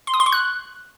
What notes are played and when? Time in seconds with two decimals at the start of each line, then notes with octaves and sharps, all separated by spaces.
0.07 C6
0.14 D#6
0.20 C6
0.26 C#6
0.32 F#6